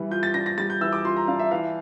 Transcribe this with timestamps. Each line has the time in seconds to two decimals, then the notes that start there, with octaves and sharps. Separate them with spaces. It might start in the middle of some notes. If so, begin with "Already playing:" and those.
Already playing: E3 G3
0.11 F4 G6
0.23 A6
0.34 D4 A#6
0.46 A#6
0.58 G3 A6
0.70 G6
0.81 E3 E6
0.93 D6
1.05 F4 C6
1.16 A#5
1.28 D4 F5
1.39 E5
1.51 E3 F5